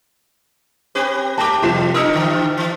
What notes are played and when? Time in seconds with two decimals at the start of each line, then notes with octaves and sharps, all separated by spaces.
0.95 C4 G4 B4
1.38 A3 G4 A5 D6
1.62 F1 F3 F#3 E7
1.94 D4 D#4 A#4 D#6 E6 C#7
2.14 D3 E3
2.57 E3